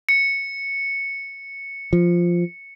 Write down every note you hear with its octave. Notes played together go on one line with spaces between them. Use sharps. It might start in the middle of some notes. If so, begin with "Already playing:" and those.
C#7
F3